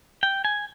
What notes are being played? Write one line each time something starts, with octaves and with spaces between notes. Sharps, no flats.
G5
G#5